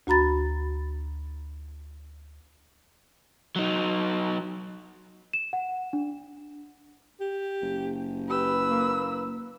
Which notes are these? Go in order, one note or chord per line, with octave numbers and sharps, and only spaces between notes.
D2 F#4 A#5 B5 A6
F#3 D#4
E7
F#5
D4
G4
F#1
G4 B4 E6
A#3